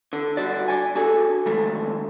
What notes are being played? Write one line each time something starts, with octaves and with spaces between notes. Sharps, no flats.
D3
G2 D3 F#4 D5
D5 G#5
D4 F#4 G#4 A4
F2 D3 D#3 G#3 A3